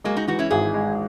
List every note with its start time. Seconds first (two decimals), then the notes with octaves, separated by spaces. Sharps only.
0.04 F#3 G#3 A#3
0.17 D#4 F#4
0.28 E3 D#4 F#4
0.39 C#4 E4
0.50 G#1 E4 G#4
0.74 G#3